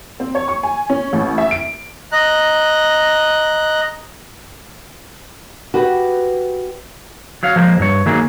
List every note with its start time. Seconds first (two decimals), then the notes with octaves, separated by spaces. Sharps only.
0.20 C4
0.35 C#5
0.48 C#6
0.63 G#5
0.90 C#4
1.13 A1
1.38 E5
1.51 D7
2.12 D#5 A#5 F#6
5.74 F#4 G4 B4
7.43 F#3 C#5 F5
7.56 F3 G#3 A#3 C5
7.79 G2 C#5
8.06 D#3 F#3 A#3 G#4